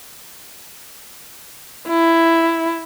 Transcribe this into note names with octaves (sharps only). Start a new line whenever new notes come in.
E4